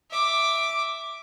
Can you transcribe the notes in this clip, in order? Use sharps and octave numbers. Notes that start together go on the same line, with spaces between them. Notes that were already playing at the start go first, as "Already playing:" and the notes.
E5 D6